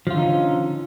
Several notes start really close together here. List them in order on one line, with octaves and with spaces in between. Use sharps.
F3 F4 D3 D#4 C#4